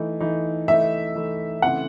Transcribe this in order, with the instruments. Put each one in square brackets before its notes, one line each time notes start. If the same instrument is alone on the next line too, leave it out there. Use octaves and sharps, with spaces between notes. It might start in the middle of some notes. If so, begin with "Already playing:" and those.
Already playing: [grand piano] E3 A3 D#4
E3 A3 D#4
[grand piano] E3 A3 D#4 [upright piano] E5
[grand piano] E3 A3 D#4
[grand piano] C#3 E3 A3 C4 [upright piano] F#5